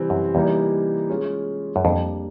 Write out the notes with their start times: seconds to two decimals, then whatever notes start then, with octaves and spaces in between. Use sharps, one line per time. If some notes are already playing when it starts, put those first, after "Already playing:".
Already playing: C3 E3 G3 C4
0.10 F#2
0.35 E2 C3 E3 G3 A#3 D#4
1.10 G#3 C#4 F4 G#4
1.76 F#2
1.84 F2 G3 A#3 D4 G4